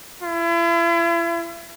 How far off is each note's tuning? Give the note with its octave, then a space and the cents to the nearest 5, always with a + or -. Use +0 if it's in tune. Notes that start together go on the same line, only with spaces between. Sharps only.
E4 +40